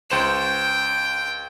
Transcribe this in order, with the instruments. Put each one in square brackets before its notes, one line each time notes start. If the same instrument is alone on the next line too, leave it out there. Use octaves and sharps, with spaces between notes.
[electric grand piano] C#2 C5 E7 [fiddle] G5